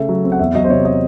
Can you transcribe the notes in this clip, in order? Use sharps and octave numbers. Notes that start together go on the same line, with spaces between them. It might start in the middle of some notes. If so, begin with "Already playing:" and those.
Already playing: C#3 A3 E5
F#3
C4
F#5
E2 E5
F#3 D#5
C5
C3 C#5
D#5